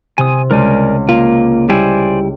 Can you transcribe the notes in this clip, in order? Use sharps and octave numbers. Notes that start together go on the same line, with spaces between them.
C3 G#5 D#6
C#2 A#4 D5 G#5
A#3 F4
G3 E4 C5 D5 G#5